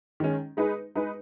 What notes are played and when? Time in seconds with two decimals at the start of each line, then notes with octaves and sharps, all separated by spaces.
0.20 D#3 G#3 C#4
0.57 G#3 D#4 G#4 B4
0.95 G#3 D#4 G#4 B4